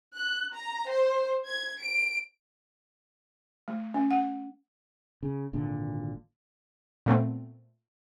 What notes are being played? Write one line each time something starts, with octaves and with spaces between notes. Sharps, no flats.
F#6
A#5
C5
G#6
D7
A3
C#4
F#5
C#3
G#1 A#2 D3
A#2 A3 B3 C4